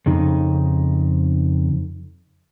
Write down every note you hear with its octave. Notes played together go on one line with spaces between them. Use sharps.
F2 C#3 D#4